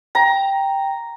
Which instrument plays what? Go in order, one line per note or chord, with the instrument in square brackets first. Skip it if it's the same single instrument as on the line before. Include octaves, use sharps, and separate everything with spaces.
[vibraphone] G5 [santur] A#5